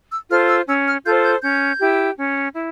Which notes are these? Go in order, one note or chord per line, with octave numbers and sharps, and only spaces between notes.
E6
F4 A4 C5 F6
E6
C#4 E6
F6
F4 A4 C5 G6
G6
C#4 G6
E4 G4
C#4
E4